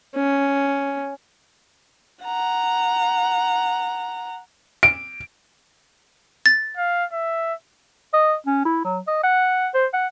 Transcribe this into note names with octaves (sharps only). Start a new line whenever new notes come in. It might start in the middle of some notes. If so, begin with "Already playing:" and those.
C#4
F#5 A#5
D7
A6
F5
E5
D#5
C#4
E4
F#3
D#5
F#5
C5
F#5